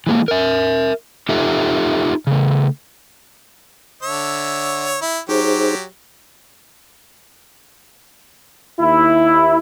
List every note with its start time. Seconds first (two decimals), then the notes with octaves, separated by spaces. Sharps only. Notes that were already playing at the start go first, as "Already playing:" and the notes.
0.07 E3 G#3 A#3
0.28 A#4 E5
1.29 D#4 F4 G4 A4 E5
2.27 C#3 A3
4.03 D3 C#5 E5
5.01 E4
5.29 F#3 D#4 G4 G#4 C5
8.80 D#2 E4